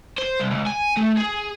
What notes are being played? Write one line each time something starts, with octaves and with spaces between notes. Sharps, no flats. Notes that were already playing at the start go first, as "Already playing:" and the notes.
C5
C2
C#2
G#5
A3
G#4